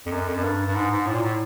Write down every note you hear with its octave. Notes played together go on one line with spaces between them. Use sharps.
F2
F#2
F2
F#2
G2
G2
G#2
G#2
A2
A#2
A2